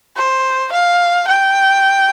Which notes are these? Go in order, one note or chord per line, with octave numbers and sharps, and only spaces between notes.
C5
F5
G5